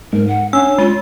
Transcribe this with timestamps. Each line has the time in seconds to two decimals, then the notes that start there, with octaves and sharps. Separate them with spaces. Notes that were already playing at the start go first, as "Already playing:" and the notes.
0.13 G#2 A#4
0.28 F#5
0.53 C#4 D4 E6
0.78 G#3 F4